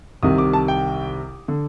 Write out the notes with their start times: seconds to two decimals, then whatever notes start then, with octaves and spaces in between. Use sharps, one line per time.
0.23 C2 C3 D#3 D#6
0.38 D6
0.53 A5
0.68 G5
1.48 D3